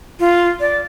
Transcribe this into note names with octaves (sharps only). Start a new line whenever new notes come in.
F4
D5